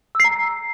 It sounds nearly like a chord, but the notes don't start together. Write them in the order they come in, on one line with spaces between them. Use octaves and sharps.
E6 C7 A#5